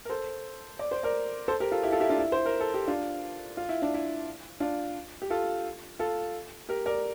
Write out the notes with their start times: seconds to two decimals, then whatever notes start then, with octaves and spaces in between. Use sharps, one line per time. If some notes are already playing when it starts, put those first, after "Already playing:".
0.05 A#4
0.09 A4 C5
0.79 D5
0.91 C5
1.03 A#4 D5
1.48 A4 C5
1.60 G4 A#4
1.72 F4 A4
1.83 E4 G4
1.92 F4 A4
2.00 E4 G4
2.09 D4 F4
2.18 E4
2.32 C5
2.46 A#4
2.60 A4
2.74 G4
2.87 D4 F4
3.57 F4
3.69 E4
3.82 D4
3.94 E4
4.60 D4 F4
5.22 G4
5.30 F4 A4
5.99 F4 A4
6.69 G4 A#4
6.86 A#4 D5